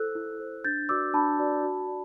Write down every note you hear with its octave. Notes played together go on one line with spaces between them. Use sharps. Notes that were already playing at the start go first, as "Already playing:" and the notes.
Already playing: E4 A4 C5 E6 F#6
E4
A4 C5
D4 G6 A6
F#4 B4 D5 D6 E6
D4 A5 B5
F#4 B4 D5
F#4
D5